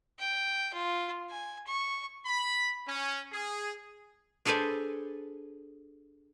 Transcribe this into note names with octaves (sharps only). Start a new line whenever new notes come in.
G5
F4
G#5
C#6
B5
C#4
G#4
D4 G#4 A4 B4 C5 G#5